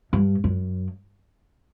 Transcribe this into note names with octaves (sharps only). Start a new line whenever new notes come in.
G2
F#2